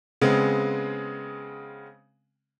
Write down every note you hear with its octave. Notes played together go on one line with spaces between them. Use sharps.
C#3 G#3 B3 C4